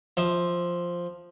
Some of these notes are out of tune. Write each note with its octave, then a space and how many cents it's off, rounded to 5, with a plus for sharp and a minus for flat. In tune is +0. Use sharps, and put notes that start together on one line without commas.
F3 +0 E5 +0